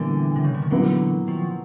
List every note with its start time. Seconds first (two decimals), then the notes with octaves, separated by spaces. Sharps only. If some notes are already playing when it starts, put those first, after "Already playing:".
Already playing: A#2 D3 E3 G3 B3
0.36 C3
0.45 C#3
0.54 D3
0.62 D#3
0.71 A#2 D3 E3 F#3 B3 E4
1.28 D#3 F3